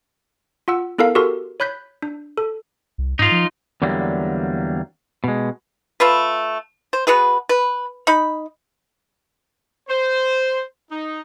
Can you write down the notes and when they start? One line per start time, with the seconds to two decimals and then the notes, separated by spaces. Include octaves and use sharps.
0.68 F4 F#5 E6
0.98 B3 E4 A4 A#4 F5 A#5
1.15 F#4 G4 A4 A#4 C6
1.60 C#5 B5 F#6 G6 B6
2.02 D4
2.37 A4
2.98 C2
3.19 G#2 D#4 F4
3.32 F3
3.82 E2 D3 F#3 G3 A#3
5.24 B2 G#3
6.00 A3 F4 B4
6.93 C5
7.07 B3 F#4 G#4 B4
7.49 B4
8.07 D#4 B5
9.89 C5
10.91 D#4